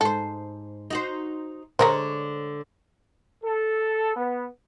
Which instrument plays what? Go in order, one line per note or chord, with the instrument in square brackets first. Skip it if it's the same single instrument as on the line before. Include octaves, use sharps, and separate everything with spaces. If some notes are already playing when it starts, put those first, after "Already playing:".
[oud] G#2 C5 [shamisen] A4
[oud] D#4 F#4 C5
[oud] D3 D4 C#5 [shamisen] G#3 A#4 C5
[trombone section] A4
B3